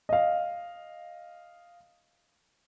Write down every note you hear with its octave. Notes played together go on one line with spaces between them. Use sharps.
D#5 F5